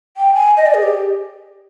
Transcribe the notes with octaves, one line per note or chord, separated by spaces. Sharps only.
G5
G#5
D#5
D5
G#4
G4